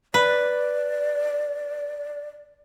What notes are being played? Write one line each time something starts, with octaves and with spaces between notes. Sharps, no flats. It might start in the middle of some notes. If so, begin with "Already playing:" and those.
B4 D5